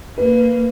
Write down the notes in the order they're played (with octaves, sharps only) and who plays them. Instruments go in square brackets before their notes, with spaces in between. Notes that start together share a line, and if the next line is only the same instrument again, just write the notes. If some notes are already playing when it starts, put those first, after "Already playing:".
[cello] A#3 [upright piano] B4